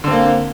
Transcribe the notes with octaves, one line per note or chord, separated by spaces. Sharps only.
D3 A#3 C4